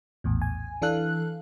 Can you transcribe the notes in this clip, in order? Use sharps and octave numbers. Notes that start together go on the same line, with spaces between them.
A#1 E2 A2
G#5
E3 D4 A4 F5 F#6